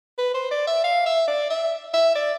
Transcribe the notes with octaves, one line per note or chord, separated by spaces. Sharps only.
B4
C5
D5
E5
F5
E5
D5
E5
E5
D5